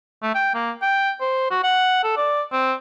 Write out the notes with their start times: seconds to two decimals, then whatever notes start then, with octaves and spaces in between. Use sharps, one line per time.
0.22 A3
0.35 G5
0.54 A#3
0.82 G5
1.20 C5
1.50 F#4
1.63 F#5
2.04 A4
2.17 D5
2.52 C4